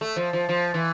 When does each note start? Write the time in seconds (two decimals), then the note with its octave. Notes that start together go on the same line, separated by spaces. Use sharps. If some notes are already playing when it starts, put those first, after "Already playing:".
0.01 A3
0.16 F3
0.33 F3
0.49 F3
0.74 E3